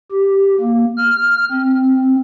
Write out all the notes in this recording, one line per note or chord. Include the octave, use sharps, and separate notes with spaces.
G4
A#3
F6
C4